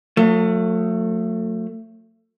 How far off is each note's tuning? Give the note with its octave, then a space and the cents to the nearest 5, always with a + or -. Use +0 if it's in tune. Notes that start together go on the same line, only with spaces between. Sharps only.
F#3 -35 A3 +25